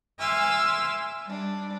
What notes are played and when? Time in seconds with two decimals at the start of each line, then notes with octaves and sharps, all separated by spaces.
0.20 E5 G#5 C6 D6 E6 F6
1.25 G3 D4